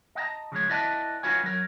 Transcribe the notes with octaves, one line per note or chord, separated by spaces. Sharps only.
D#5 F#5 G5 A5 A#5
C#3 F3 G#3 C#5
E4 B4 D5 D#5 F#5 A5
D#4 F4 F#4 B4 C#5 G#5
F#3 A#4 C#5